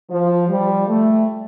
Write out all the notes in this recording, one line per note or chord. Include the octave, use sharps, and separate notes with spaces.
F3
G3
A3